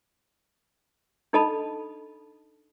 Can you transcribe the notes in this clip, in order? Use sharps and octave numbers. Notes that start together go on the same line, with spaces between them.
D4 D#4 A4 D#5 A5 B5